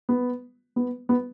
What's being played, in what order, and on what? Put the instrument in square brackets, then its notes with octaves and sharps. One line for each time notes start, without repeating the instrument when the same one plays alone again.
[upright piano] B3
B3
B3